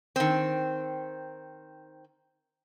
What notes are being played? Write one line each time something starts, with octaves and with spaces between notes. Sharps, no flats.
D#3 C4